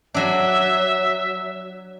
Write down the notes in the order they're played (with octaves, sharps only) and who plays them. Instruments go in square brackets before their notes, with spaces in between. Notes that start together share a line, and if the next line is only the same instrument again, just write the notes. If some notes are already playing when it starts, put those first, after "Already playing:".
[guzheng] F#3 D4 [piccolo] E5